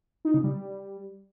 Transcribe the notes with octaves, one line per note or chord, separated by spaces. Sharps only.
D#4
C#3
G3